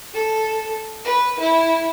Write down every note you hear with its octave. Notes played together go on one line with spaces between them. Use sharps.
A4
B4
E4